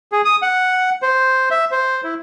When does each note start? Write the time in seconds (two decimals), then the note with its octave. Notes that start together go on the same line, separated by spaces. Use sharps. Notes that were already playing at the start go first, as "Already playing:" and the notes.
0.12 G#4
0.25 D#6
0.42 F#5
1.02 C5
1.51 E5
1.72 C5
2.04 E4